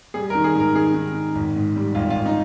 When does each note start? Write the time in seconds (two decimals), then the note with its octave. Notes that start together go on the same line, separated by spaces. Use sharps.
0.14 G3 G#4
0.30 A#4
0.35 D#3
0.44 G#4
0.55 G#2 A#4
0.75 D#3 G#4
0.95 D#3
1.14 D#3
1.35 G#1
1.56 G#2
1.76 G3
1.95 G#1 F4
2.10 F4
2.16 G#1
2.26 D#4